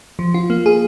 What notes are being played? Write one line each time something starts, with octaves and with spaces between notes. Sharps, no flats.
F3
F4
A#3
G#4